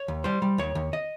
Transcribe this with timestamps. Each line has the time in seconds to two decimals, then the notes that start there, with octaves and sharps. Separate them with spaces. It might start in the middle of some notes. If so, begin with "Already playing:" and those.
Already playing: C#5
0.08 D#2
0.24 G3 C5
0.42 G3
0.58 D#2 C#5
0.75 D#2
0.93 D#5